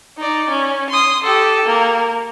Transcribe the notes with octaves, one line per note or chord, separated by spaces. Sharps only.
D#4 D5
C#4
C6 D#6
G4 A4
A#3